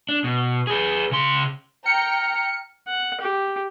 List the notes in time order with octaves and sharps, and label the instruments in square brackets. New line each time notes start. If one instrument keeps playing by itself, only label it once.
[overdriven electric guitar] D4
B2
G#4 B4
C#3 C6
[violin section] G5 A#5 [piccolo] F6 [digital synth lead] C#7
[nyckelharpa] F#5
G4